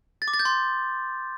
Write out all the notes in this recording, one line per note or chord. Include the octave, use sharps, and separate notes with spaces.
A6
D6
A6
G6
C6